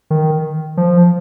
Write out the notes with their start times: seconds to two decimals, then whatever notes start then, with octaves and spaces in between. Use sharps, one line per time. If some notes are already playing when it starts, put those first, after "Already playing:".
0.10 D#3
0.77 F3